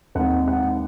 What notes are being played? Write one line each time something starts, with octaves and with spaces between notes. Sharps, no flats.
D#2 D#3 G#3 C4 F#5
F#5